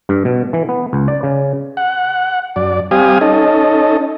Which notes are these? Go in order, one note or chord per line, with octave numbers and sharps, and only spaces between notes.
G2
B2
E3
B3
C#2
D5
C#3
F#5
F#2 D5
G3 C4 G4 F5 G#5 D#6
C#4 D#4 A4 D#5